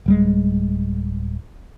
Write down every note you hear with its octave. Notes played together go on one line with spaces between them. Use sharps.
D1 G3 G#3